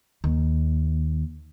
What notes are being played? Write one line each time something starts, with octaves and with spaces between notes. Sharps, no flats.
D#2